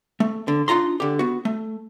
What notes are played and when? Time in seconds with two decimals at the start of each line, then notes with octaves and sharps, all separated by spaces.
0.20 A3
0.48 D3
0.68 D4 D#4 F4 A#5 C6
1.00 D3 G4
1.19 B3 F#4
1.45 A3